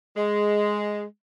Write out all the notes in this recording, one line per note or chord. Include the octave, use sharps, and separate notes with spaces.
G#3